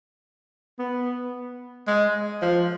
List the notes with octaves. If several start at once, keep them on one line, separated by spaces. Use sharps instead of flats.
B3
G#3
F3